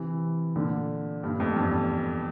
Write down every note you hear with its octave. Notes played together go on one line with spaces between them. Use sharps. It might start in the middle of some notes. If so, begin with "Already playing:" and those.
Already playing: C3 E3
A#2 D3
G2 A#2
F2 A2
E2 G2